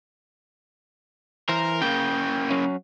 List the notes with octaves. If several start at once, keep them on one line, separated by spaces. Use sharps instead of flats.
E3 A#4 C5
C#3 A#3 G5
F#3 C#4